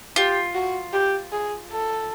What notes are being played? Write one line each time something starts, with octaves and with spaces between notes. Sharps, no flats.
F4 G4
F#4
G4
G#4
A4